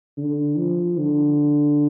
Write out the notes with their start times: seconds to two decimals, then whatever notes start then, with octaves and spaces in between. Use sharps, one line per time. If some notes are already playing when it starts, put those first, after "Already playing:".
0.17 D3
0.57 F3
0.97 D3